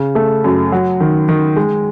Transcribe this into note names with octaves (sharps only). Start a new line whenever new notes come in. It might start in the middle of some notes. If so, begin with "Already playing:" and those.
Already playing: C#3
A3
F#2
F#3
D#3
D#3
G#3